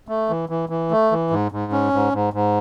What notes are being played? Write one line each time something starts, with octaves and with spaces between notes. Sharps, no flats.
A3
E3
E3
E3
A3
E3
G#2
G#2
C#4
G#2
G#2
G#2